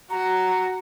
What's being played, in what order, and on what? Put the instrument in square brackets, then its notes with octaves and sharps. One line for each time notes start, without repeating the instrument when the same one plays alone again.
[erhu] F#4 [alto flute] A#5